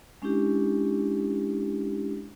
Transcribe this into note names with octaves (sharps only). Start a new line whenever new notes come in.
G#3 C#4 D4 E4 G4